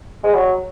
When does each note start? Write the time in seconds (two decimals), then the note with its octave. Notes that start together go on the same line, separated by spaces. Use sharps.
0.24 G#3
0.34 F#3